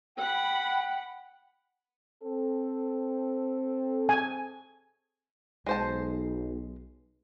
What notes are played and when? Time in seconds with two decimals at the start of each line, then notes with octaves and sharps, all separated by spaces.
0.16 F#5 G5 B5
2.23 C4 A4
4.09 G#5
5.66 B1 G#3 C5 A5